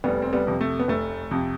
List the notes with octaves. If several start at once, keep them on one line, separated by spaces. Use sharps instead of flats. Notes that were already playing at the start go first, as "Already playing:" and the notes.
F1 G3 B3
C4
G3 B3
F2 C3
A3
B3
F1 A3
F2 C3